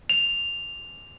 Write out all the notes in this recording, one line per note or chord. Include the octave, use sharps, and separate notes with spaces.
F7